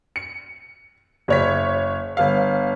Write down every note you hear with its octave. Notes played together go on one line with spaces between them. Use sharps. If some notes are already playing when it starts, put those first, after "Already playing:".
C#7
F#1 C#5 B6
G1 F5